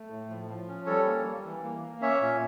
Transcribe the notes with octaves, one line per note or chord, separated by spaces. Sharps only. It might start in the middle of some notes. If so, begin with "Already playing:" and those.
Already playing: A3
A2
F3
F3
C#4
G3 A4 C#5
A#3
G3
E3
A#3
A#3
C#4 C#5 E5
A#2